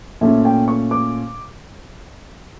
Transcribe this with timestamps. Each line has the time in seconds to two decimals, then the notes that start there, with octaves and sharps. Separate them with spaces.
0.21 A#2 A3 C#4 E5
0.45 G5
0.68 C#6
0.91 D6